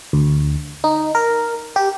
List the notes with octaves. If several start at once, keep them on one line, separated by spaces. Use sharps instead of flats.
D2
D#4
A#4
G4